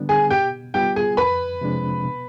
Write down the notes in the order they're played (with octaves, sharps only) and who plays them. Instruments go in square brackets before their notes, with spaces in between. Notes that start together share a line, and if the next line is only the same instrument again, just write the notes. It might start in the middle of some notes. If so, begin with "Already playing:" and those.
Already playing: [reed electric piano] D3 G3 B3 D4
[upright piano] G#4 G#5
[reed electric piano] B2 [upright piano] G4 G5
[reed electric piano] G3 B3 F4 [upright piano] G4 G5
[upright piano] G#4 G#5
[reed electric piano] F2 [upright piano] B4 B5
[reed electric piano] C3 F3 G#3 D4
B2